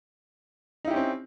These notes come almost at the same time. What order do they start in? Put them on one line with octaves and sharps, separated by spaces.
D#4 E4 G4 C#4 C4